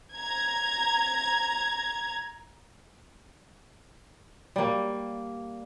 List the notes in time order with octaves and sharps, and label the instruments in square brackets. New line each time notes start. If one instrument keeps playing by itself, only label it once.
[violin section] A#5 G#6
[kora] G3 A#3